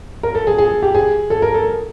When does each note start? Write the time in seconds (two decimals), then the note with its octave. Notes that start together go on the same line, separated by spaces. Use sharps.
0.23 A#4
0.35 A4
0.47 G#4
0.58 G#4
0.83 G4
0.95 G#4
1.30 A4
1.42 A#4
1.54 A4